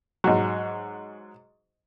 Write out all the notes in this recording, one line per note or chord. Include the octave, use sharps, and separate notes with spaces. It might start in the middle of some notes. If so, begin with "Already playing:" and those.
G#2 F#3